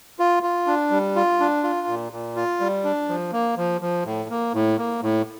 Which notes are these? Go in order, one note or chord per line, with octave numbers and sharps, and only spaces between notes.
F4
F4
D4
G3
F4
D4
F4
A#2
A#2
F4
G3
D4
F3
A#3
F3
F3
A2
A#3
A2
A#3
A2